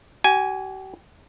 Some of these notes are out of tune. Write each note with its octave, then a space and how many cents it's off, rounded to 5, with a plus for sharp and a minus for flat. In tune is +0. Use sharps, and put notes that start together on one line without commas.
G4 -45 G#5 +0